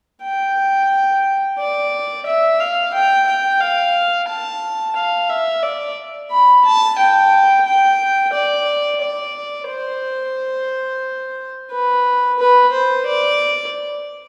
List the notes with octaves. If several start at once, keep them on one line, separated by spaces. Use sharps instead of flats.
G5
D5
E5
F5
G5
G5
F5
A5
F5
E5
D5
B5
A5
G5
G5
D5
D5
C5
B4
B4
C5
D5